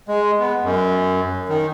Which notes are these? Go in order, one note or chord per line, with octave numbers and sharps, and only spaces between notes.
G#3
B3
F#2
D#3